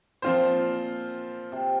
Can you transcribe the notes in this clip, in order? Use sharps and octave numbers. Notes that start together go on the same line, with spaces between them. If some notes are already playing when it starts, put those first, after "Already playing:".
A#2 F3 C4 F4 C5
C3